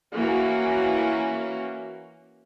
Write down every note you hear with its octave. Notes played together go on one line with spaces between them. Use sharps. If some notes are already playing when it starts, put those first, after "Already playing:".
E3 A#3 C#4 F#4